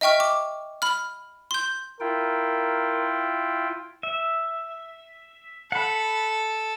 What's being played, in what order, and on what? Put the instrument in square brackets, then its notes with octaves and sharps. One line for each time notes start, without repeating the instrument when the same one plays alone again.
[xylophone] D#5 E5 G5 C#6 F6
D6
B5 F6
C6 G6
[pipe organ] E4 F4 G5 [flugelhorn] A#4
[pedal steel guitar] E5
[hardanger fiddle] A4 [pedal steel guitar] F#5 B5